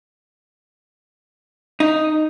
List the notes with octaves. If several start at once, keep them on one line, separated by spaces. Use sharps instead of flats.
D#4